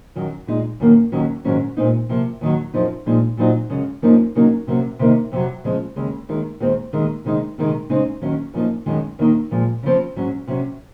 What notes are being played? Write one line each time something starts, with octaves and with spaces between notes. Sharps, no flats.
F#2 D#3 F#3
A#2 G#3 D#4
F#2 D#3 A#3
D#2 D#3 F#3 C#4
G#2 D#3 F#3 C#4
A#2 G#3 C4 D#4
C3 F3 A#3
D#2 D#3 F#3
F#2 F3 C4 D#4
A#2 F3 G#3 D#4
A#2 F#3 C4 D#4
F#2 C#3 G#3
F#2 F3 A#3 D#4
C#3 F#3 A#3 D#4
C3 F#3 A#3 C#4
C3 D#3 A#3 D#4
F2 C3 F#3
C#3 F3 G#3 C4
D#2 C#3 G#3
D#2 D#3 G#3
D#2 D#3 G#3 C4
D#2 D#3 G#3
C3 D#3 G#3 D#4
C3 D#3 G#3 D#4
C#3 G#3 C4 D#4
D#2 D#3 F#3 C#4
F#2 F3 A#3 D#4
F#2 D#3 G#3
D#2 D#3 A#3 D#4
A#2 F3 G#3
C#3 F3 C4
G#2 F#3 C#4
C3 F#3 C#4